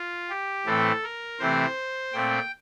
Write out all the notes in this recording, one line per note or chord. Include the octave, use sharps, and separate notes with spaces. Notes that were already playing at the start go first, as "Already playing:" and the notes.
Already playing: F4
G4
A2 E3 A3 C4 A4
A#4
C3 E3 A3 C4 C5
A#2 A3 C4 G5